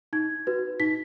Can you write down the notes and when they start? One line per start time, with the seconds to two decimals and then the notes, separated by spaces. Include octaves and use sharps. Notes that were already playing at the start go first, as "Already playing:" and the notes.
0.13 D#4 G#6
0.47 F#4 B4
0.80 D#4 B6